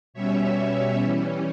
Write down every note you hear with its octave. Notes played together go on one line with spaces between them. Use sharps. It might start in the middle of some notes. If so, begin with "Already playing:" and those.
B2 G3 C#4 C#5 E5
E3 G3 C#4